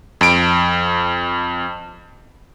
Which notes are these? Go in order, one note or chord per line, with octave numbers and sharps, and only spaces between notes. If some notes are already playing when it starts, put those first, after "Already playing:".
F2 D7